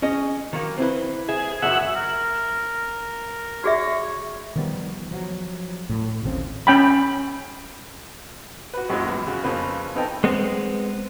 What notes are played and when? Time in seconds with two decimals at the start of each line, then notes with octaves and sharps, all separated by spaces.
0.02 C#4 G#4 D#5
0.53 D#3 F#3 A#3
0.78 C4 E4 B4
1.29 G#4 E5
1.62 C#2 F#2 F#4 E5 F#5
1.95 A#4
3.64 F#4 G#4 C#5 E5
4.56 D#3 F3 G3 B3
5.11 F3 F#3
5.89 A2
6.23 D#1 A1 C#3 C4
6.67 C#4 G5 B5
8.74 F#4 B4
8.89 A#1 F#2 A#2 F#3 G#3
9.08 E2
9.27 C#3 F#4
9.44 F2 C#3 A#3 B3 B4
9.94 B3 C4 D#4 A4 G5 A5
10.24 G#3 B3 C4